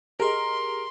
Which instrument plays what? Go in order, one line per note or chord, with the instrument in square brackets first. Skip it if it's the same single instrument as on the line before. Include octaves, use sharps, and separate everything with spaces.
[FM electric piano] G4 G#4 D#5 [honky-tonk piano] A#4 [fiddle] C6